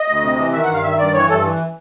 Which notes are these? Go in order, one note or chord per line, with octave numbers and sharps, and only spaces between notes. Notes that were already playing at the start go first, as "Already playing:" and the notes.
Already playing: D#5
D2
C3
E3
D#3 E5
F#5
G2
F5
D#3 E5
G2 D5
E3 C#5
G2 A4
E3